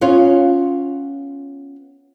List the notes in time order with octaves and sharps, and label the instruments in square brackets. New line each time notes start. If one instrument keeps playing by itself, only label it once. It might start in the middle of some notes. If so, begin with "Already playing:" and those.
[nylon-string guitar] B3 C#4 F4